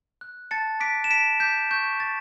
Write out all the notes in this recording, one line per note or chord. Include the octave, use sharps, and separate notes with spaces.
F#6
A5 A6 C#7
D6 F#6 B6 D7
E7
A5 B6 D7
D6 F#6 G6 B6
C#6 G6
G6 A6